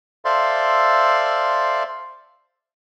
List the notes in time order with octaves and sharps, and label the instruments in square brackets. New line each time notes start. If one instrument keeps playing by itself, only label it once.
[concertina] A4 C5 D5 E5 F5 C6